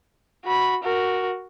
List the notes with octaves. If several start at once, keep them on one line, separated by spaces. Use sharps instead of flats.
F#4 B5
F#4 A#4